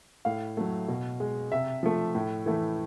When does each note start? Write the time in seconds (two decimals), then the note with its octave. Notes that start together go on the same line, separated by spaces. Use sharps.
0.25 A2 F5
0.57 F#3 A3
0.88 B2
1.20 G#3
1.51 C3 E5
1.83 F3 A3
2.15 A2
2.46 E3 A3